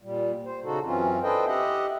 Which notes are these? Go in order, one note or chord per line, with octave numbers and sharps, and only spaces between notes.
A#2 G3
C5
C#3 D#4 F#4 A4
F#2 E3 C4 C#4 F4
D4 A4 B4 C5 D#5 G5
G4 D#5 E5 F#5